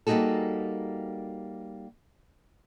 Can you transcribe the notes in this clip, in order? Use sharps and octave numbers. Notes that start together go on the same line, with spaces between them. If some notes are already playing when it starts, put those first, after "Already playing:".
G3 A#3 D#4 F#4 G#4 A4